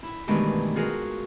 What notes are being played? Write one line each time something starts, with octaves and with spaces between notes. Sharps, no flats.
E4
G2 B2 D#3 E3 G#3 A3
F4 F#4 G#4 A#4